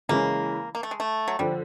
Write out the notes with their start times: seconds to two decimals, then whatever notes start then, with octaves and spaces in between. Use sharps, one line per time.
0.09 C#3 E3 G#3 A#3 C#4 E4
0.75 A#3
0.83 A3
0.91 G#3
1.00 A3
1.28 F#3
1.39 D3 F3 G3